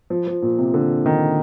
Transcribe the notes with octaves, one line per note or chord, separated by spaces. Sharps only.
F3
F3
A#2
C3
D3
D#3